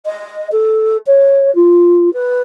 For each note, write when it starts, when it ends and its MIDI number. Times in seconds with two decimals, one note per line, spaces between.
0.05 0.48 75
0.52 0.97 69
1.06 1.53 73
1.55 2.12 65
2.13 2.42 71